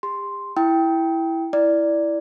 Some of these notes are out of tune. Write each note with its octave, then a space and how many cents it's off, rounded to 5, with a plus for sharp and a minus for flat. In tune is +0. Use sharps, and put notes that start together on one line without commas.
G4 +40 C6 +0
E4 +0 G5 +0 D#6 +40
E4 +0 D5 +0